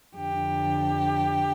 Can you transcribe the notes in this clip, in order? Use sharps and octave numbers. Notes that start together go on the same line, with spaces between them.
F2 D3 G4